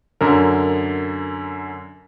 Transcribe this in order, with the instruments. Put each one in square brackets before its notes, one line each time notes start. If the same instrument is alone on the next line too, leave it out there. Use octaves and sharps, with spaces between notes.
[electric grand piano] F#2 D3 A#4